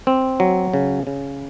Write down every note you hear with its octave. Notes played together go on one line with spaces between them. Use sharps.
C4
F#3
C#3
C#3